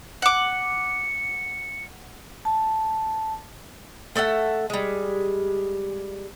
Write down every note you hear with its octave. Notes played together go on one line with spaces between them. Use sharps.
F#5 D6 C#7
A5
A3 A4 E5 F#5
G3 G#3